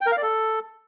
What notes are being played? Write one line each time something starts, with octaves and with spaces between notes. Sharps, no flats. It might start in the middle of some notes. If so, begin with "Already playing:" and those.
G5
A#4
F5
D5
A4